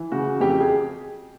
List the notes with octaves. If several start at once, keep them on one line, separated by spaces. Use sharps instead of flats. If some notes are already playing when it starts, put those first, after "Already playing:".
Already playing: E3
C#3 F#4
F2 G4
G4
G#4